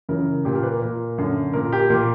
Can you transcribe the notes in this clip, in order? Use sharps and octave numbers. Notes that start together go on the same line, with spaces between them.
F#2 C#3 E3 A#4
A#2 G4
A#4
B4
A#4
A#2
F#2 D3
A#2 A#4
G4
A#2 A#4